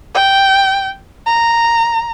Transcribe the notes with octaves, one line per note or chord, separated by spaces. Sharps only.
G5
A#5